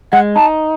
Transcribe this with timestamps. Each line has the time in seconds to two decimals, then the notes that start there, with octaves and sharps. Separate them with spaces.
0.12 G#3 F#5
0.36 D#4 A5